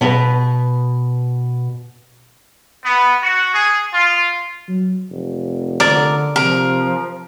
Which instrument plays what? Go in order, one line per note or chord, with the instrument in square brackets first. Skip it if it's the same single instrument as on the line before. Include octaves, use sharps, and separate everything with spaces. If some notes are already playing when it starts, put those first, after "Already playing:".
[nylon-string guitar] B2 B4
[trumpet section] B3
F#4
G#4
F4
[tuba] F#3
F1
[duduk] D3 [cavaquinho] A#4 [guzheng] D5
[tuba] C3 [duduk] F3 [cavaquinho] A#4